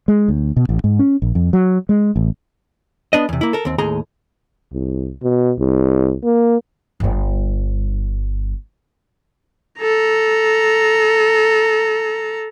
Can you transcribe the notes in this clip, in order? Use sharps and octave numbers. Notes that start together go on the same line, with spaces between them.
G#3
D2
B2
A1
G#2
C#4
A#1
F2
F#3
G#3
A1
B3 D4 D#5
E2 C3
A#3 E4
A4 A#4
D#2 C4
D#2 A2 G#4 A#5 C6
C2
B2
C2
A#3
G1 G2
A4 A#5